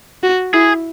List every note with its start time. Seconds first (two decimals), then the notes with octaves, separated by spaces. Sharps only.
0.23 F#4
0.54 E4 G#4